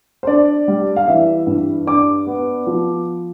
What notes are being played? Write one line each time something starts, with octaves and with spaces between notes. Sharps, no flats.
C5
D4 D5
G3
F5
E3 E5
G2
D4 D6
B3
F3